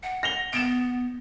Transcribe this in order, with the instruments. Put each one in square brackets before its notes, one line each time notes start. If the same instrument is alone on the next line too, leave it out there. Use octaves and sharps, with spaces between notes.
[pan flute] F#5
[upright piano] A#6 F7 G7
[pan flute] B3 [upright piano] D7 E7